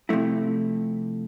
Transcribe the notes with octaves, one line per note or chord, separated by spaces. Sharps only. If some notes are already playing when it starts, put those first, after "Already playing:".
C3 E3 F3 A3 E4